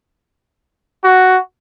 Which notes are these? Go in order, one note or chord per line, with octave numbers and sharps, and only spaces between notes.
F#4